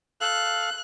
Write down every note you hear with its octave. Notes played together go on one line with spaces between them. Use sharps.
A4 F5 F#6